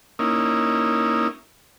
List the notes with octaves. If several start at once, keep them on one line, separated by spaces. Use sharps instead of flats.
A#3 C#4 D#4 E4